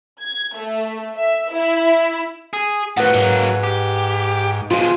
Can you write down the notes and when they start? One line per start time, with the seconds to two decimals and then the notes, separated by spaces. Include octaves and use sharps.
0.20 G#6
0.56 A3
1.15 E5
1.52 E4
2.53 G#4
2.97 A2 F3 B4 F#5
3.14 G#2 F#3 A#3
3.64 G4
4.71 B2 G#3 F4